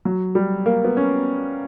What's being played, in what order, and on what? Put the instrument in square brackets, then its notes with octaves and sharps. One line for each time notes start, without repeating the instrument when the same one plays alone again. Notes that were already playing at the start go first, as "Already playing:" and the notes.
[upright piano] F#3
G3
A#3
B3
C#4